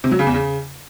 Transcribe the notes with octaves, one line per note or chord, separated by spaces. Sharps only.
C3
F#3
C#3
E2
C#3